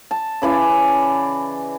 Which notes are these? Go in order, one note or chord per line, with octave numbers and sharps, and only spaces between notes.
A5
C#3 E3 D5 G#5